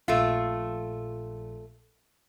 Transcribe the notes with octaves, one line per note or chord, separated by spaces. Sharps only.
A#1 A#2 A3 F4